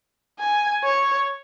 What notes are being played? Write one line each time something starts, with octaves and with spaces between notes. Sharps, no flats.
G#5
C#5